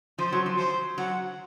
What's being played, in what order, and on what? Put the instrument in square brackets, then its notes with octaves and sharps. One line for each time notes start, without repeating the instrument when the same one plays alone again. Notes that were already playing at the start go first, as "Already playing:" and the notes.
[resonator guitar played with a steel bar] F3 [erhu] C5
[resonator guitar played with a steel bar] F#3
F3
[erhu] C5
[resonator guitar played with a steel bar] F#3 [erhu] F#5